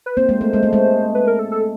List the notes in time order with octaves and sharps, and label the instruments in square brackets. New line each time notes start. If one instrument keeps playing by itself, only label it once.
[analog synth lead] B4
[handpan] A#3 C4 [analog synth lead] C5
[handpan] G#3 A#3
A3
G#3
A3
G#3
[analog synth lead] B4
A#4
A4
A4